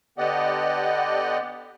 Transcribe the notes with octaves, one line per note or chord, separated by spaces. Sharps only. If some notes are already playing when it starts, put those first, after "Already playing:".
D3 B3 G4 D5 D#5 F#5